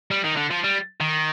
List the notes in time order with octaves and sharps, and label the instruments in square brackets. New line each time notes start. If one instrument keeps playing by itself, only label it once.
[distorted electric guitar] G3
D#3
D3
F3
G3
D#3